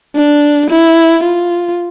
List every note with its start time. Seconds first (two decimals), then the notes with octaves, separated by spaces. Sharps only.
0.15 D4
0.70 E4
1.24 F4